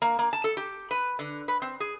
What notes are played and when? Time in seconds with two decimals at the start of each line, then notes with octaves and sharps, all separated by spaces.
0.02 A#3
0.19 A#3
0.33 A5
0.44 A4
0.57 G4
0.91 B4
1.19 D3
1.48 B4
1.62 C4
1.80 G#4